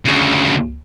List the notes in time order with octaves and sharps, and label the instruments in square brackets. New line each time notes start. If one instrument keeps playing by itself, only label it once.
[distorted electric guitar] D2 C#3